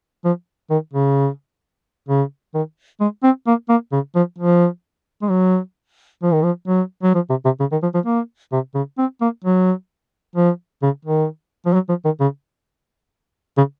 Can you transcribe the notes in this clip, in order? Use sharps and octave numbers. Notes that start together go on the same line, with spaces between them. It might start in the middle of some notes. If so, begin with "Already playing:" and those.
F3
D#3
C#3
C#3
D#3
G#3
C4
A#3
A#3
C#3
F3
F3
G#3
F#3
F3
D#3
F3
F#3
F#3
F3
C3
C3
C#3
D#3
F3
F3
A#3
C3
C#3
C4
A#3
F#3
F3
C#3
D#3
F3
F#3
F3
D#3
C#3
C#3